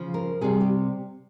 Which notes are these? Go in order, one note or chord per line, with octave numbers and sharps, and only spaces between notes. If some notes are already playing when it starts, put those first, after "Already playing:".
Already playing: C#3 F3
A#4
C3 G3 G#4
G4